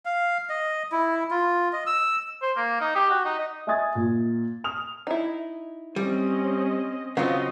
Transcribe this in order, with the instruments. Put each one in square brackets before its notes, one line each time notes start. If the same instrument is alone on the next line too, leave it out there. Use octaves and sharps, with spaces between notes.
[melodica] F5
D#5
E4
F4
D#5
E6
[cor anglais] C5
A#3
D#4
G4
F#4
D#4
D#5
[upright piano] D#5 E5 G#5 D#6 G#6 A6
A#2
D#6 F6 F7
[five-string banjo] D#4 E4
[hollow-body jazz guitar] G3 [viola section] C4 C#4 D#5
[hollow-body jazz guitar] C#3 F#3 C4 [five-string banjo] B3 F4 [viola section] D#5